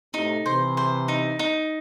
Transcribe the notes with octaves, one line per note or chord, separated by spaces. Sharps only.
A2 C3 D#4
C3 E3 C5
C5
D#4
D#4